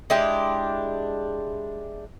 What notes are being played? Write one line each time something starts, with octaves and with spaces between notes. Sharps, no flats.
G#3 D4 E4 G4